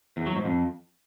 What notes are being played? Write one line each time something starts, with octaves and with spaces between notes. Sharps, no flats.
E2
F#3
G#2
F2